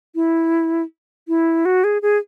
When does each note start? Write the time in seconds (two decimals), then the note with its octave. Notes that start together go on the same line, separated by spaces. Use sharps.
0.15 E4
1.28 E4
1.65 F#4
1.84 G#4
2.02 G#4